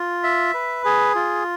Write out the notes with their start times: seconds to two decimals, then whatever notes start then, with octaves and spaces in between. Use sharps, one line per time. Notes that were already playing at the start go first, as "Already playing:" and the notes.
Already playing: F4
0.23 E5
0.54 B4
0.85 G#4
1.15 F4